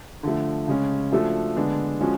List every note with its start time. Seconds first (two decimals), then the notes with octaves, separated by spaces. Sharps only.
0.23 D3 F3 A3
0.68 C#3 G#3 C#4
1.12 F3 A3 D4 F#4 A4
1.56 D3 G#3 B3 D4
2.01 F3 G#3 C#4 F#4